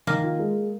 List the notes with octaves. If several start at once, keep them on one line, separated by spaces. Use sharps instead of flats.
D#3 A#3
F4
G#3